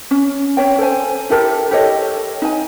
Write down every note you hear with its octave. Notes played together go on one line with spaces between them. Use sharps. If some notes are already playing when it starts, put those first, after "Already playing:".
C#4
C#4 C#5 G5
A4 C5 G#5
E4 G4 A4 A#4
G4 A4 C#5 D#5
D#4 G#5